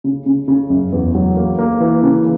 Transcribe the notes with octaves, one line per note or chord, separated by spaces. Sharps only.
C#3
C#3
C#3
F#2
E2
F#3
A#3
A#3
E3
C#3